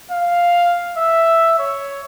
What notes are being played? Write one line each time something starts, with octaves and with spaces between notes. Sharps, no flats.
F5
E5
C#5